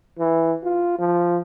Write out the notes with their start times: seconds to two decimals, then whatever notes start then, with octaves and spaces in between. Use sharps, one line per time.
0.19 E3
0.64 F4
0.99 F3